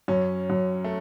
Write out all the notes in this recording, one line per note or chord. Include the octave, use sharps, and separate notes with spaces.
F#2 C#4
F#2
A3